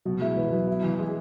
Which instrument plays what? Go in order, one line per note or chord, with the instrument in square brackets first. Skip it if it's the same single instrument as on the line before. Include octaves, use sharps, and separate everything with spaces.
[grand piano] B2 [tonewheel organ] F#3
[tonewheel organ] G#3 [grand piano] E4
[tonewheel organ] E3 [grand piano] B4
[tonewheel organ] F#3 [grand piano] B3
[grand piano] E4
E3
G#3